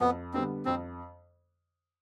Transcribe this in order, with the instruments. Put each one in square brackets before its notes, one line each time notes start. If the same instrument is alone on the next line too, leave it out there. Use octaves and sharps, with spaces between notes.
[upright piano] F2 [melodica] B3
[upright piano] D3 G3 B3 [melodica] C4
[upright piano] F2 [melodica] C4